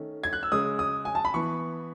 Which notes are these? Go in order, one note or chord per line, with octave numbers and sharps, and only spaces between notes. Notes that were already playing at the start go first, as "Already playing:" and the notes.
Already playing: D#3 A3 C#4
G#6
F#6
E6
C#3 G#3 C#4 D#6
D#6
G#5
A5
B5
E3 B3 C#6